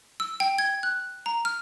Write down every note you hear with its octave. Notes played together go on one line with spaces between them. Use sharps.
E6
G5
G#6
F#6
A#5
F6